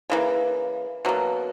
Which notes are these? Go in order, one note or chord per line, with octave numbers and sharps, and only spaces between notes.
C#3 E3 A#3
B2 F#3 A#3